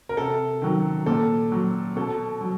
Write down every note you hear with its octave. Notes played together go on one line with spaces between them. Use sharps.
A#4
C3 A4
D#3 F#3
A#2 A4
F#3
B2 A4
F#3